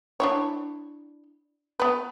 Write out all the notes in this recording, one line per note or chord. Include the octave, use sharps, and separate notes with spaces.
D4 E4 C#5
B3 B4